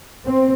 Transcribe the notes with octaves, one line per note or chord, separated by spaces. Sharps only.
C4